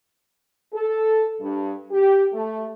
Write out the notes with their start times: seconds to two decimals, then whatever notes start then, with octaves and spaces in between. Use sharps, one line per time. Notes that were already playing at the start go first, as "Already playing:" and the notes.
0.74 A4
1.41 G2
1.91 G4
2.33 A3